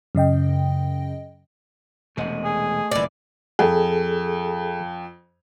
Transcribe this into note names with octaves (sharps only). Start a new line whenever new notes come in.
F#2 C#3 D#5 G5
E1 C3 A3 D#5 F#5
G#4
F#1 A#2 E3 D5
F2 G#4 A4